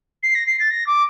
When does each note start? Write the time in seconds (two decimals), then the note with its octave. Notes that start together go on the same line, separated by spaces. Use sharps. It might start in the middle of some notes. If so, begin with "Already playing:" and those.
0.23 C7
0.35 A#6
0.47 C7
0.60 A6
0.70 A#6
0.87 D6